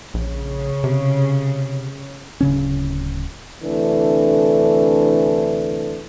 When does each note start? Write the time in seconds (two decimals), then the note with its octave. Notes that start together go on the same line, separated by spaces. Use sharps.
0.14 A#1 C#3
0.84 C3
2.41 D1 C#3 C#4
3.63 D2 C3 E3 A3 D4 A4